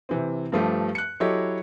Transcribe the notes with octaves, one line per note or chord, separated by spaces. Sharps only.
C3 E3 C4
G2 F3 A3 G4
F#6 C#7
F#3 E4 G4 A4 C#5 D#5